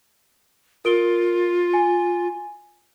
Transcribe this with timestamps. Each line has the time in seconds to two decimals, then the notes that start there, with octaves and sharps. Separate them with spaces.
0.85 F4 A#4 D7 G7
1.73 G#5